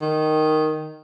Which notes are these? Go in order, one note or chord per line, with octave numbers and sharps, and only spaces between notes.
D#3